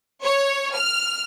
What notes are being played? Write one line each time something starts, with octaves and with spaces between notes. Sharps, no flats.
C#5
F6